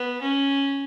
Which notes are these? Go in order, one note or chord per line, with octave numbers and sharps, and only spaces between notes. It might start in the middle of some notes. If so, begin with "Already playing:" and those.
Already playing: B3
C#4